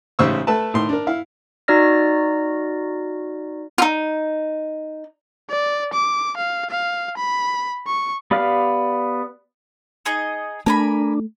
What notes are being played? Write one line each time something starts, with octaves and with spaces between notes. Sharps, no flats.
A1 G#2 C#3 C5 C#6 E6
A3 A4 B4 A5
A2 D#3 C6
D4 A#4
E4 F5
D#4 F#4 D5 F6 A#6
D#4 F4
D5
D6
F5
F5
B5
C#6
B3 G4 D5 F5 F6
D#4 G#4 D#5
A3 D4 A#4 G#5 B5